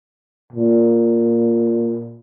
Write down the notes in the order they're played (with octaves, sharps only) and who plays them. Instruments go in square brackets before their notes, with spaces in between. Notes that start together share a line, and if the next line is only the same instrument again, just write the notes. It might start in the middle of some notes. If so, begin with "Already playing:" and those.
[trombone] A#2